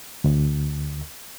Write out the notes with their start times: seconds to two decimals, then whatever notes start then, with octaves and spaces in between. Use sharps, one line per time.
0.24 D2